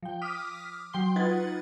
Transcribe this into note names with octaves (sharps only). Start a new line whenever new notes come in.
F3 G5
D6 D#6 F6 B6
F#3 G5 C6 G7
D#4 F4 B4 F#5 G#6 A6